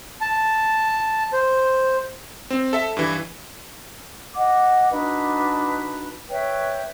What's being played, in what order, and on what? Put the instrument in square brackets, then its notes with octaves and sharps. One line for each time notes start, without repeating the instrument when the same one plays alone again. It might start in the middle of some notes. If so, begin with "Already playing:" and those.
[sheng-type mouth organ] A5
C5
[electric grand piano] C4
A4 E5
G2 E3
[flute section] D#5 F#5 D6
D4 D#4 F#4 B4
B4 C#5 E5 G5